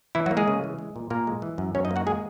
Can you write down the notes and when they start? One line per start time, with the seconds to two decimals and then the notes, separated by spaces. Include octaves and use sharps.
0.15 E3 E4
0.26 F#3 F#4
0.31 A#3
0.37 G#3 G#4
0.48 C#3
0.64 E3
0.79 G#3
0.96 A#2
1.10 A#2 A#3 A#4
1.27 G#3
1.42 E3
1.58 F#2
1.75 F#2 C#4 C#5
1.85 D#4 D#5
1.91 A#3
1.96 F#4 F#5
2.07 G#3 G#4 G#5